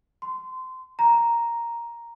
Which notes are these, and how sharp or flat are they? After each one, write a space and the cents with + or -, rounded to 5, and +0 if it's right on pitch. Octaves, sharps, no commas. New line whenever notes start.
C6 -25
A#5 +0